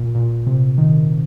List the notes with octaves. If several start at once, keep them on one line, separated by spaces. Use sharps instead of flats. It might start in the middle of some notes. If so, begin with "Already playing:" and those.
Already playing: A#2
A#2
C3
D#3